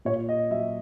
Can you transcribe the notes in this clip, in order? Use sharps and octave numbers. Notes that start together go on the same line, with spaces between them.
A#2 C#5
D#5
F#3 E5